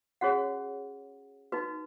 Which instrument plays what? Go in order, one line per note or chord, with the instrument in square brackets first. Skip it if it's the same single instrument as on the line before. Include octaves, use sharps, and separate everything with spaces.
[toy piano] C#4 F#4 G#4 C#5 F#5
D#4 F#4 B4